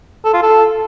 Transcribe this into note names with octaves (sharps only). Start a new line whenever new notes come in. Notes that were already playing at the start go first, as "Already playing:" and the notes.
A4
F4
A4